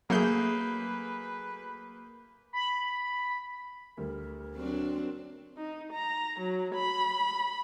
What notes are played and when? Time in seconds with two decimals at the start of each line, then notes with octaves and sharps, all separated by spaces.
0.10 F#3 A3 A#3 G#4 B4 G6
2.53 B5
3.97 D2 G3 A#4
4.55 F#3 C4 D4
5.57 D#4
5.92 A#5
6.39 F#3
6.74 B5